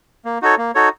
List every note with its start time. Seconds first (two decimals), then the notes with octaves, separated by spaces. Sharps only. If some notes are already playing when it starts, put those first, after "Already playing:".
0.25 A#3
0.42 D#4 F#4 A4 C#5
0.58 A#3
0.75 D#4 F#4 A4 C#5